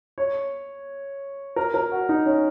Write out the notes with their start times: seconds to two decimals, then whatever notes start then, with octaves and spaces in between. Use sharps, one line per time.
0.18 C#5
1.56 A#4
1.74 A#4
1.92 F#4
2.09 D#4
2.26 C#4